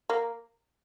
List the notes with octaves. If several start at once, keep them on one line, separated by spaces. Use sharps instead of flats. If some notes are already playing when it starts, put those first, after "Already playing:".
A#3